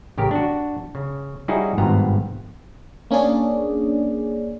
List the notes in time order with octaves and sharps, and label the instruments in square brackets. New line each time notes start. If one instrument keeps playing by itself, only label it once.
[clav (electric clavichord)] A1 C#3 G4 A#4
D4 F#4
C#3
G3 C#4 D#4 E4 F#4 G#4
G#1 G2 B2 B3 F4 A#5
[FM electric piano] A#3 C#4 D4 G#4 D5